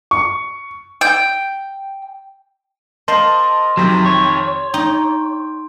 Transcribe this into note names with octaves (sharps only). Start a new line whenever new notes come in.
C#6
G5
A#4 C5 D#5 F5 A5 C6
F2 C3 D#3 F#3
C#5
D#4 G5